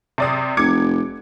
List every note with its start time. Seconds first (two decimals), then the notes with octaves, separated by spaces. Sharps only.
0.18 C3 D5 D#6
0.57 F1 D6 G#6 C#7